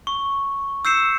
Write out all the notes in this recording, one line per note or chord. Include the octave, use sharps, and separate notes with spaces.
C#6
E6 G6 C7 C#7 E7